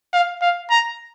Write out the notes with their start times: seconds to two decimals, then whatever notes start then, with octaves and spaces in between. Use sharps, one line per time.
0.13 F5
0.42 F5
0.70 A#5